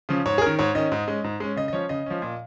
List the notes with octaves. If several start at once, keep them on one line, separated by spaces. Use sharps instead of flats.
C#3 F3 C#4
G#2 C#5
G#4
D#3 C#4 A#4
G#2 C#5
D#3 C#4 D#5
G#2
G#3 C#4
G#2
G#3 C#4
C#3 D#5
D#5
F3 C#4 C#5
C#3 D#5
F3 C#4
A#2